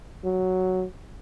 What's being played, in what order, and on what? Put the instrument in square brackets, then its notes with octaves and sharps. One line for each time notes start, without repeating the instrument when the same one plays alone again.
[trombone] F#3